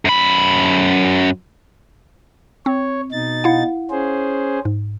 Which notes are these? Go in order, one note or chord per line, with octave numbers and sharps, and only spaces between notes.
F#2 B5
C4 C#5
B2 D#4 A6
E4 F5 F#5
C#4 G#4 C5
G#2